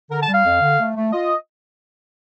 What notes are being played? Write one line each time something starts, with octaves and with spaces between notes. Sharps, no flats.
D3 A#4
A5
G3
F5
F2
D3
A3
A3
F4 D#5